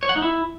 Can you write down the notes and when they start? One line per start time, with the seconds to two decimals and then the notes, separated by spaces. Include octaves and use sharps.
0.03 C#5
0.09 F#5
0.16 D#4
0.22 E4